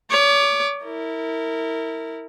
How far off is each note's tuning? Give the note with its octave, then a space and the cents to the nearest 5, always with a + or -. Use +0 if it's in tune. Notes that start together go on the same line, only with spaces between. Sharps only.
C#5 +40 D6 +20
E4 -20 A#4 -25